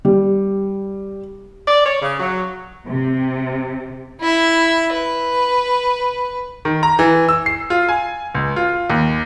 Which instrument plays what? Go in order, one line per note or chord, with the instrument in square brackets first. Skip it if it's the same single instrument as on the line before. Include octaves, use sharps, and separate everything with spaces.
[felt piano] G3
[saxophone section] D5
C#5
C#3
F#3
[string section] C3
[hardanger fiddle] E4 E5
B4
[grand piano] D#3
A#5
E3
E6
C7
F4
G#5
C#2
F4
D#2